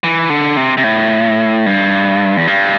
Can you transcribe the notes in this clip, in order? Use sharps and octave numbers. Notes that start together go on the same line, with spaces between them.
E3
D3
C3
C3
A2
G2
E2
G2